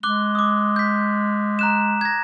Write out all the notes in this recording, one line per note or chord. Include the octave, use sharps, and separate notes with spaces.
G#3 D6 F#6 G7
D6 D#6
G6 B6
A#5 F#6 E7
G#6 A#6